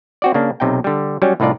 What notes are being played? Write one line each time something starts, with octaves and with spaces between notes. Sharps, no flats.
C4 F#4 D5
C#3 A#3 D4
B1 C3 D#4 G5
D3 G3
F#3 G3 C#4
C2 A2 D#4 F4 D5